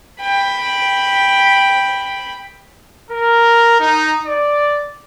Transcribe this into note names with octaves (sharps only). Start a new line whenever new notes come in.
G5 B5
A#4
D#4
D5